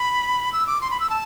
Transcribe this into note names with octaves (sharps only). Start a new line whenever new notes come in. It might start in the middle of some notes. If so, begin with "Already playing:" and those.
Already playing: B5
E6
D6
C6
B5
E6
A5